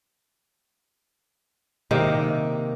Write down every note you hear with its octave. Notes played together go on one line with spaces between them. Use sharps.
C3 D#3 A#3